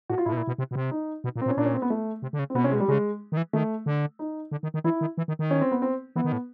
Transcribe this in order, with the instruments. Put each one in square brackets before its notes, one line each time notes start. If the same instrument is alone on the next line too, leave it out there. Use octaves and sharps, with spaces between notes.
[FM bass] A2 [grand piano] F#4
[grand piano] F4
[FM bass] A2 [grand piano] E4
[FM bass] B2
A#2
B2
C3
B2
C3
[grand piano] D#4
[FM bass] B2
A#2
[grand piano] C4
[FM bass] A#2
[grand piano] C#4
[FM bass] A#2 [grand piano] D4
[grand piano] C#4
C4
B3
A3
[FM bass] C3
D3
C#3
[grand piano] C4
[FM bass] B2 [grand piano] B3
[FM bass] C3 [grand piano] C#4
[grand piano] G#3
[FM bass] B2
[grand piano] G3
[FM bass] C#3 [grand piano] G#3
[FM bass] D#3
E3
[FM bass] D#3 [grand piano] A3
[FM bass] D3
[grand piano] D#4
[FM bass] D3
D#3
D#3
[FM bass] E3 [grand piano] E4
[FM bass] D#3
E3
D#3
D#3
[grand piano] C#4
C4
B3
C4
[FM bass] E3 [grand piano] B3
[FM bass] D#3
A2